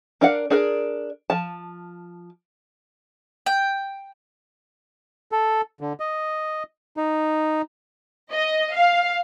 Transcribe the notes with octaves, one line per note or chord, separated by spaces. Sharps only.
D4 A#4 D5 F5 F#5
D4 G#4 A#4 D5
F3 A5
G5
A4
D3
D#5
D#4
D#5
F5